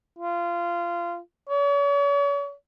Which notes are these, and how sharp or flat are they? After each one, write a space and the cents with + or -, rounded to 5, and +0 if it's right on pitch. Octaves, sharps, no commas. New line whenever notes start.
F4 -20
C#5 +40